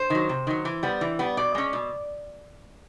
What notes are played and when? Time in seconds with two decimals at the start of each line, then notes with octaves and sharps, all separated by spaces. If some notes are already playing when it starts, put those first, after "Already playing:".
Already playing: C5
0.10 D#3 F#3
0.29 C3
0.47 D#3 F#3
0.65 E3
0.83 G3 B3
1.01 E3
1.19 G3 B3
1.37 B2 D5
1.55 G#3 C#4
1.73 B2